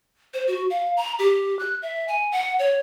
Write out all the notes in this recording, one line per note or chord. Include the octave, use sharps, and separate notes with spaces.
C5
F#4
F5
A#5
G4
F#6
E5
G#5
F#5
C#5